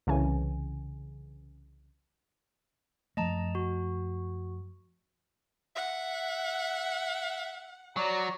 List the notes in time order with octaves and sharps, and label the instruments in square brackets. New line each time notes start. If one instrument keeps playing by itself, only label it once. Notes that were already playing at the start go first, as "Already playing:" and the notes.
[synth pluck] C2 C#3 E3 G#5
[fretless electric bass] F#2 F3 A3 [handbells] D#5 A5 A#5
[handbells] F#4
[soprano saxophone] E5 [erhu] F#5
[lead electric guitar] F#3 [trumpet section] D5 A#5